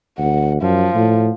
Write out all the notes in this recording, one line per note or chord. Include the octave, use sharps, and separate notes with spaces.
D2 F#5
F#2 F3
A2